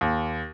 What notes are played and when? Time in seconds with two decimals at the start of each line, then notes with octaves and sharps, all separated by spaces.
0.01 D#2